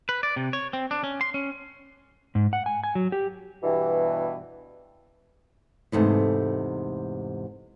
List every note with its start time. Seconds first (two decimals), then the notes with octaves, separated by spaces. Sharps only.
0.09 B4
0.23 D5
0.36 C3
0.53 C#5
0.73 C4
0.91 D4
1.04 C#4
1.21 C6
1.34 C#4
2.35 G#2
2.53 F#5
2.66 G#5
2.84 G#5
2.95 F#3
3.12 G4
3.63 G2 B2 E3
5.92 E2 G#2 C3 A3